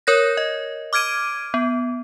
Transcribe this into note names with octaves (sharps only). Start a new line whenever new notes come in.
A#4 C#5 G6 A#6
D#5
D6 F6 G#6 D7 D#7
B3